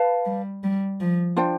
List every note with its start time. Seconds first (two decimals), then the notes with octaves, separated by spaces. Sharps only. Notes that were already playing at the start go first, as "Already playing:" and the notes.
Already playing: B4 F5 A5
0.25 G3
0.63 G3
1.00 F3
1.36 D4 F4 C5 G5